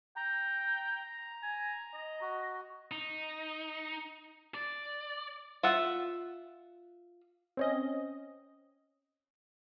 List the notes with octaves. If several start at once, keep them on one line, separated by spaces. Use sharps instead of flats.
G5 A#5
G#5
D#5
F#4
D#4
D5
F4 E5 F#5
C4 C#4 D#5